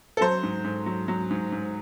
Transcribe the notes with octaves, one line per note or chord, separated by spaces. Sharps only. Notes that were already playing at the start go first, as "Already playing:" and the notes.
A4
F#3 C5
G#2
G#2
F#3
F#3
G#2
G#2